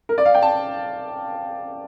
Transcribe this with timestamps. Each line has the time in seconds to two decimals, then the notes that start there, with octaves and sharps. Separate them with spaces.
0.09 A#4
0.18 D5
0.26 F5
0.35 G5
0.43 A5